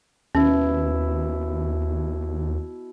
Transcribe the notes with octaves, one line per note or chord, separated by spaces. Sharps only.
D#2 B2 C#4 E4